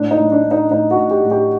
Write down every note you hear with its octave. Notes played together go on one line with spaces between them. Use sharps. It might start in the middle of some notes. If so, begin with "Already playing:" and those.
Already playing: A2 D4
D#4
A2
D4
A2
D#4
A2 D#4
F#4
A2
G4
A2
G4